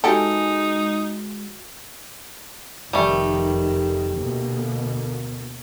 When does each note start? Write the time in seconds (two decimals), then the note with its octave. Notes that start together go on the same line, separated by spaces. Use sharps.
0.04 E3 G#3 D#4 F#4 G4 A4 G#5
2.93 F1 D#3 G3 A3
4.17 D2 B2 A#3